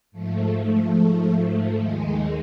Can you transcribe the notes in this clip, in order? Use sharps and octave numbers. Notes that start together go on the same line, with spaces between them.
G#2 F3 A3
D#2 D#3 G#3